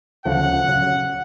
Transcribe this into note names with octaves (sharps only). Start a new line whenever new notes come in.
D2 C#3 F3 A3 F#5
C#3 F#3